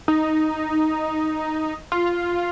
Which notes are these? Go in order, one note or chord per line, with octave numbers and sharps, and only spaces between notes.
D#4
F4